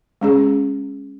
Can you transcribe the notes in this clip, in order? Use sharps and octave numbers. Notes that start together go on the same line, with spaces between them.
G#3 C#4 G#4